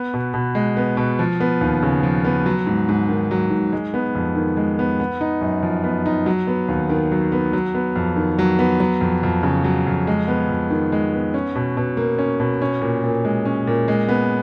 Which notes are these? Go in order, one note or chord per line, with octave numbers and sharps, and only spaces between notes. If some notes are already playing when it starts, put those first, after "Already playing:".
Already playing: B3
B2
B2
G#3
B3
B2
F3
B3
D#2
C#3
F3
B3
F#3
G#2
G#2
D#3
F#3
G#2
G#3
B3
F2
D#3
G#3
B3
B3
D#4
F#2
F3
B3
D#4
F#3
B3
D#2
D#3
F#3
B3
F#3
B3
F2
D#3
F#3
B3
F#3
F2
F2
C#3
F#3
F2
G#3
B3
F2
D#3
G#3
B3
C#4
B2
B2
A#3
C#4
B2
C#4
A#2
A#2
G#3
C#4
A#2
G#3
B3